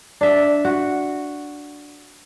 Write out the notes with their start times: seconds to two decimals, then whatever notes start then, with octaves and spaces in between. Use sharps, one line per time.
0.21 D4 E5
0.65 F#4